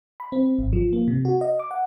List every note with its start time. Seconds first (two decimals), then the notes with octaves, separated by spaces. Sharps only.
0.20 B5
0.32 C4
0.59 G#1
0.73 F3
0.93 A#3
1.08 C3
1.25 F#4
1.41 D#5
1.59 D6
1.71 F#5